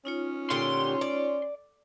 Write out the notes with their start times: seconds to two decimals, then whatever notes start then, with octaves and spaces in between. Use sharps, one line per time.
0.05 C#4 D#4 F4 C#5
0.50 A#2 D3 G4 C6
1.01 D5